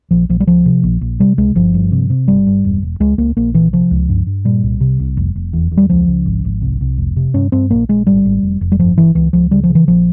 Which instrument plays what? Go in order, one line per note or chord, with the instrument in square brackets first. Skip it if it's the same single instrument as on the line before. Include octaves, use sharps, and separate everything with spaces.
[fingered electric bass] A#1 F3
A#1 F3
G3
C#2 F3
C3
A#1
A#1
C3 G3
C#2 G#3
G1 F3
G2
C3
C3
G1 G3
G2
E1
E1
C#2 G#3
C#2 A#3
A#1 A#3
A#2 E3
C3 F3
C#2
G2
G2
A#2 G3
C2
C3
C2
F1
F1
E2
E2
G3
C#2 F3
C#2
G#1
G#1
C2
C2
F1
C3
G2 C#4
G2 C4
A#1 A#3
A#1 G#3
G#1 G3
G#1
F1
F1
G3
G2 F3
G1 E3
C#2 E3
C#2 F3
C#3 G3
F3
C#3
E3
A#1 F3